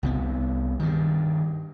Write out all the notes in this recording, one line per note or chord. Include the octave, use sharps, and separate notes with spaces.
C2 C3 B3
G2 D#3